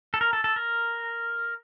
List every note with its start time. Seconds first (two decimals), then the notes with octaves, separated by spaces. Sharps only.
0.14 A4
0.21 A#4
0.33 A4
0.44 A4
0.56 A#4